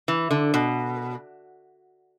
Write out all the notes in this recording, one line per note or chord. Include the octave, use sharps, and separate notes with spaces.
E3
D3
B2